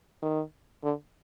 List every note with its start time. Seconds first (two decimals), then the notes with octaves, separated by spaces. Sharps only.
0.22 D#3
0.83 D3